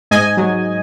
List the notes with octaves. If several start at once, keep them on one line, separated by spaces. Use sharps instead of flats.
G#2 D#5 G#5
F#3